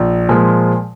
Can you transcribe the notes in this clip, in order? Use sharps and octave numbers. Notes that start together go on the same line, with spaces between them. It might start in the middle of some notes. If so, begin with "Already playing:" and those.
Already playing: A#1
A#2 F3 G#3